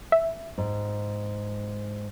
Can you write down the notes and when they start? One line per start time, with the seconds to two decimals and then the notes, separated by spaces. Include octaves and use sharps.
0.12 E5
0.58 G#2